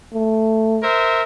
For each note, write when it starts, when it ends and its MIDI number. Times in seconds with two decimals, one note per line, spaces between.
0.14 0.83 57
0.83 1.23 70
0.83 1.23 72
0.83 1.23 76